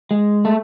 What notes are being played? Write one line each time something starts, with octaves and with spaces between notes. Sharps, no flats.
G#3
A3